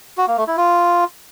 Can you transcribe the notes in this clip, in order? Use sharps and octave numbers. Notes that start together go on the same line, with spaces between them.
F#4
A#3
A3
E4
F4